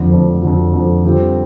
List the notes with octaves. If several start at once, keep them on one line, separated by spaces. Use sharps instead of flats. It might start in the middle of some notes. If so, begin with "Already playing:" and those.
Already playing: F2 D3 F3
F2 D3 F3
F2 D3 F3
F2 D3 F3
D3 G3 C4 F4